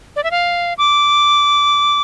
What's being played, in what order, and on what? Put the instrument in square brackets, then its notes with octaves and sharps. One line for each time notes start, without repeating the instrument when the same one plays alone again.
[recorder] D5
E5
F5
D6